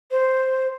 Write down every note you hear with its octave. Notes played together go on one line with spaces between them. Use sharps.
C5